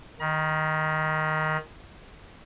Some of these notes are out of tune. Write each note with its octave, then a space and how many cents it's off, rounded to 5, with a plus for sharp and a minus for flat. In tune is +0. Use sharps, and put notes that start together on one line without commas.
D#3 +0 A#5 +40